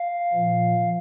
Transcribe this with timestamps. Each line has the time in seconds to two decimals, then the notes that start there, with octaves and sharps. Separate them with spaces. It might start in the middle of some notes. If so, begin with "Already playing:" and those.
Already playing: F5
0.33 A#2 F3